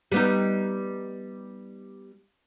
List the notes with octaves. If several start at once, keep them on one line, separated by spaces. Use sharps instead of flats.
G3 B3 D#4